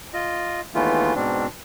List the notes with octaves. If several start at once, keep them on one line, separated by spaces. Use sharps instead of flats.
F4 D#5
D#2 E3 G#3 A3 B3 F4
G#2 B2 C4 D4